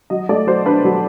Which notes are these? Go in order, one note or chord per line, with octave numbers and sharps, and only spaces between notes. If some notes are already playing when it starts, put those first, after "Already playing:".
F#3 D#5
A3 D5
F#3 C5
D4 B4
F#3